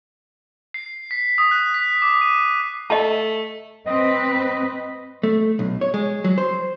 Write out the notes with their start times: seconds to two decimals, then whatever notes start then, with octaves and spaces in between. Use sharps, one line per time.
0.74 C7
1.11 B6
1.38 D#6
1.51 F#6
1.74 B6
2.02 D6
2.21 D#7
2.90 A3 D#5 A5
3.86 C4 B4 D#5
5.23 A3
5.59 B1
5.81 C#5
5.94 G#3
6.24 F#3
6.38 C5